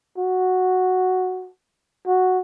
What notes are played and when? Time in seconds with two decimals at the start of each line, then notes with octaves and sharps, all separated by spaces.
0.18 F#4
2.07 F#4